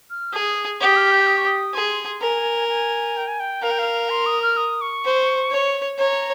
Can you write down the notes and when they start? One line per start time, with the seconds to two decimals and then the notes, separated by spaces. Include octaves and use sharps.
0.10 F6
0.33 G#4 D#6
0.81 G4 D#6
0.96 F6
1.12 G6
1.27 D#6
1.37 C#6
1.46 D#6
1.74 G#4 C6
2.22 A#4 G#5
2.69 G#5
3.16 G5
3.27 G#5
3.40 G5
3.63 A#4 F5
3.71 G5
3.79 F5
4.10 C6
4.26 D#6
4.42 F6
4.57 D#6
4.81 C#6
5.05 C5
5.51 C#5
5.98 C#5 A#5